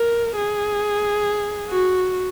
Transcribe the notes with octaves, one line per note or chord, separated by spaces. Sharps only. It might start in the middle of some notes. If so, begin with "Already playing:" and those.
Already playing: A#4
G#4
F#4